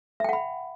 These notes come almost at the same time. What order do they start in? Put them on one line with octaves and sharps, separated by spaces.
E5 G5 F#5 B5